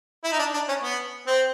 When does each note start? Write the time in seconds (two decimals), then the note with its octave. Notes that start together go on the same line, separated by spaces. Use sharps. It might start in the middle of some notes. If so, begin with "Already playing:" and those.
0.24 E4
0.32 D#4
0.39 D4
0.54 D4
0.69 C#4
0.83 B3
1.27 C4